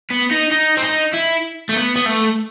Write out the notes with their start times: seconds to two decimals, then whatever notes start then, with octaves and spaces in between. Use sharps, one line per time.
0.11 B3
0.31 D#4
0.52 D#4
0.77 C4
0.82 D#4
1.14 E4
1.69 A3
1.75 B3
1.96 B3
2.06 A3